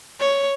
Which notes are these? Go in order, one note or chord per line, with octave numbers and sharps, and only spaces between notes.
C#5